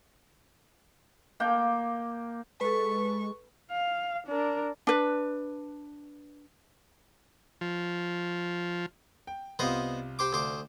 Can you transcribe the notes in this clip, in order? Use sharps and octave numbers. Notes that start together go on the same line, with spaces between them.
A#3 G5
G#3 A4 B4 C#6
F5
D4 A#4
D4 B4
F3
G5
C2 C3 B3 F4 C5 D#5
G4 C5 D6
D2 C5 D6